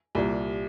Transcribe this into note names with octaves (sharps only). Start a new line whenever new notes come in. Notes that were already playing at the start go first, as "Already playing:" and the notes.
C2 A#2 G3